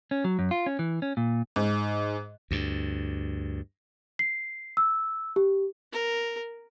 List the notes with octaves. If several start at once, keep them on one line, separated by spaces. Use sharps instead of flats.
C#4
F#3
F#2
F4
C#4
E3
C#4
A#2
G#2
D2 G2
C7
E6
G4
A#4